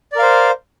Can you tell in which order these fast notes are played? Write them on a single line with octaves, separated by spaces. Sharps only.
D5 A#4 F5 C5